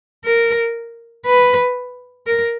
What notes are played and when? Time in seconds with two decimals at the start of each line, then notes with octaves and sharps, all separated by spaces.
0.25 A#4
1.26 B4
2.26 A#4